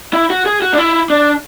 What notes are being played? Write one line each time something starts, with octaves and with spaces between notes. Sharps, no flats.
E4
F#4
G#4
F#4
D4
E4
D4